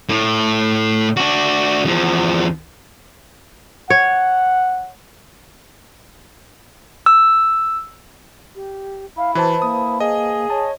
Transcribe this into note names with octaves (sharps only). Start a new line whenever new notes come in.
A2
D4 F#4
E2 F3
C#5 F#5
E6
G4
E4 F5
E3 F#4 B4 C5 A5
A#3 D#6
G#4 D#5
C#5 A5